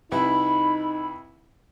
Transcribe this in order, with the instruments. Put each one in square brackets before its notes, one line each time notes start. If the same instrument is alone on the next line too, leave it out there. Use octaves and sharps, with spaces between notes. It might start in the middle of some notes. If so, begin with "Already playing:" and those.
[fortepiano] C2 E4 B4 [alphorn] D#4 [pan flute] B5